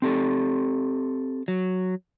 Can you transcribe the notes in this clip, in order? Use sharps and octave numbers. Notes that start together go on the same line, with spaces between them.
C4 G4 A4
F#3